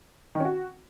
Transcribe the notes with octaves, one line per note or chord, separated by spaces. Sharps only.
D#3
C#4
F#4